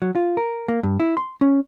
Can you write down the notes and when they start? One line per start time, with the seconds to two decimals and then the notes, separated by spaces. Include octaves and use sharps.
0.02 F#3
0.15 F4
0.37 A#4
0.68 A#3
0.83 G2
1.00 E4
1.17 C6
1.41 C#4